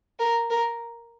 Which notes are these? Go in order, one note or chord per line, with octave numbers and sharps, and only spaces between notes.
A#4
A#4